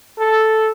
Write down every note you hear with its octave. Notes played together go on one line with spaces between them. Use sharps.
A4